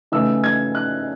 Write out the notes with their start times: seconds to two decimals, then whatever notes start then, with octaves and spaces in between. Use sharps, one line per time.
0.12 C#3 E3 A3 D#4 E6
0.44 G#6
0.75 F#6